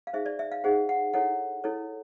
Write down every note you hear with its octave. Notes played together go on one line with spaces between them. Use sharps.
F5
D#4 G#4 C5 E5
D5
E5
F5
D#4 G#4 C5 F#5
F#5
E4 A4 C#5 F#5
E4 A4 C#5